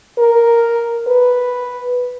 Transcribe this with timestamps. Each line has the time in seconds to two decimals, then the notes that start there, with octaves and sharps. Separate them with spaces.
0.18 A#4
1.07 B4